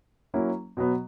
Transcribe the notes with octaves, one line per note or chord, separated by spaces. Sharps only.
F#3 A#3 C#4 E4
B2 F#3 B3